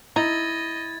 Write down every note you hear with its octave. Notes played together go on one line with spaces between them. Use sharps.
D#4 E4 D#5 G#6 A6